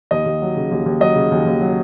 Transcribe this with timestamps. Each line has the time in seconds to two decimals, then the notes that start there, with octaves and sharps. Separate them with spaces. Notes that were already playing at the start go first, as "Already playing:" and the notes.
0.11 D#2 D#5
0.26 D#2
0.41 F#3
0.56 C#3
0.71 D#2
0.86 D#2
1.00 F#3 D#5
1.16 C#3
1.32 D#2
1.46 D#2
1.61 F#3